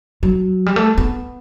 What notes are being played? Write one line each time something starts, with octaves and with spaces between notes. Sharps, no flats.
F#3
G3
A3
B3